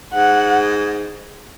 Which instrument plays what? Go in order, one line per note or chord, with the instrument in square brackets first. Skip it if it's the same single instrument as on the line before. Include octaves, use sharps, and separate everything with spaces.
[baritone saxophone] G#2 [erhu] F#5